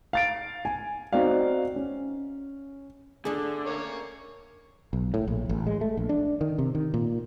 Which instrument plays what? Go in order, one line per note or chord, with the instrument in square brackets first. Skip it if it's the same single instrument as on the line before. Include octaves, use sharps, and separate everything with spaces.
[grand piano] F5 A6 D7
G#5
C4 D#4 F#4 D5 F5
C#4
[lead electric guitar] D3 [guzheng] A3 D4 [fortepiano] G#4
[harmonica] A#3 C#4 C#5
[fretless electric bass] B1
A2
A#1
A1
G#3
A3
A#1
D4
D#3
C3
D#3
A#2